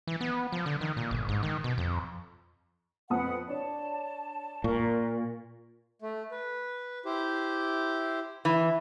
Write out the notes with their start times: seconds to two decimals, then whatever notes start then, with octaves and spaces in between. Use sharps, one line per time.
0.07 E3
0.21 B3
0.52 F3
0.66 D3
0.81 D#3
0.97 A#2
1.11 G1
1.29 G#2
1.43 D#3
1.64 B2
1.78 F2
3.10 F2 B4 F#5 A5 D#6
3.48 D4 C#5 D5 A5
4.64 A#2 A#4 C#6
6.02 A3
6.31 B4
7.05 E4 G4 C5
8.45 E3